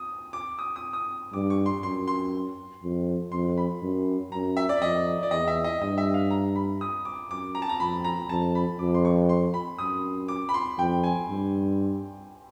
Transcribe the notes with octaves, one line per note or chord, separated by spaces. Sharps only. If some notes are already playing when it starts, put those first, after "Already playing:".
Already playing: D#6
D6
D#6
D#6
D#6
G2 D6
C#6
C6
F#2 C6
C6
F2
F2 C6
B5
F#2
F#2 A#5
E5
D5
F2 D#5
D5
E2 D#5
E5
D#5
G2 D#5
E5
F5
A#5
B5
D#6
D6
F#2 D6
A#5
A5
A#5
F2 B5
A#5
F2 A5
B5
F2 D6
C6
C#6
C6
B5
F#2 D#6
D6
B5
C6
F2 G5
G#5
G2